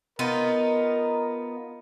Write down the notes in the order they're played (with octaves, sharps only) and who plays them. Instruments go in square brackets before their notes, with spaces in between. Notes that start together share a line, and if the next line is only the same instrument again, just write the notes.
[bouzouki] B3 D#4 F4 [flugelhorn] A#4